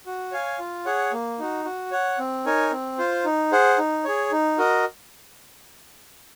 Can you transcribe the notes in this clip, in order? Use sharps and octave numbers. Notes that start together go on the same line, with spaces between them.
F#4
C#5 F5 G#5
F4
G#4 C#5 F#5
A#3
D#4 F#4
F#4
C#5 F#5
C4
D#4 A#4 C#5 G#5
C4
F4 C5
D#4
G#4 C5 F#5
D#4
G#4 C#5
D#4
F#4 A#4 D#5